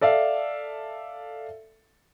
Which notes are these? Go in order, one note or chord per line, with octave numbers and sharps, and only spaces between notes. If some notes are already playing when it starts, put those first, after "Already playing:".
A4 D5 E5 F5